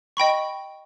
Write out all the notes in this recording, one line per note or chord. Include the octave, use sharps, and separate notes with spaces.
D#5 G5 B5 C#6